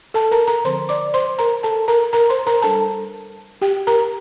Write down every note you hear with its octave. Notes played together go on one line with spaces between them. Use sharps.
A4 A5
A#4 A#5
A#4 A#5
D3 F3 C4 C5 C6
D5 D6
C5 C6
A#4 A#5
A4 A5
A#4 A#5
A#4 A#5
C5 C6
A#4 A#5
G3 D4 A4 A5
G4 G5
A#4 A#5